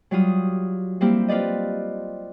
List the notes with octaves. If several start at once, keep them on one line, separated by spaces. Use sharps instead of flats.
F#3 G3 F4 D#6
G3 A#3 C4 E4 G4
C4 F4 B4 D5 D#5